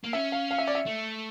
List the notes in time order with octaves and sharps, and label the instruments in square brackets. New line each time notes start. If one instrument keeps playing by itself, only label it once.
[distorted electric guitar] A#3
[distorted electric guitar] C#4 [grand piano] E5
[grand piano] F5
F5
E5
D5
E5
[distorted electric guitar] A3